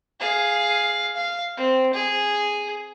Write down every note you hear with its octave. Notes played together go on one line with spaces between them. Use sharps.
G#4 F5
F5
C4
G#4